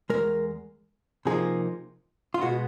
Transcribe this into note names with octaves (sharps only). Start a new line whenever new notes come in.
E2 B2 G#3 A#4
C3 F3 A#3 D#4 G#4
F4
B2 G#3 B3 F#4